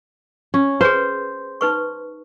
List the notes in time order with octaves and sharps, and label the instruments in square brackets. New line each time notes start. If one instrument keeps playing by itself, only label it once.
[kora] C#4
[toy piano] G#4 B4 [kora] C5
[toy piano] D#4 B4 C#6